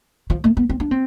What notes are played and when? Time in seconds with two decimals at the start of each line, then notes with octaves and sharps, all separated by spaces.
0.30 F3
0.44 A3
0.57 B3
0.70 C4
0.80 D4
0.91 C4